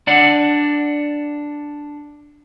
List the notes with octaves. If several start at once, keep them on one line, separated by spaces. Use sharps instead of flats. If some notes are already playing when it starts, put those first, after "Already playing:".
D4 D5 F#5